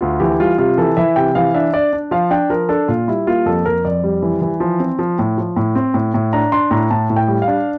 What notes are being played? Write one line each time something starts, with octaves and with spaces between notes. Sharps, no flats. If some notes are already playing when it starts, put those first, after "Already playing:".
D2 F4
E3 G4
G3 F4
C3 F4
E3 A4
E3 E5
C3 G5
E3 F5
D4 E5
D4 D5
D4
F3 F5
D4 G5
F3 A#4
D4 A4
A#2 F4
G3 E4
A#3 F4
F2 A4
F2 A#4
F2 D5
G3
E3
E3
F3
C4
F3
A2
F3
A2
C4
A2
A2
D4 A#5
D4 C6
A2 A#5
A2 A5
A2
G5
G3
F5
D4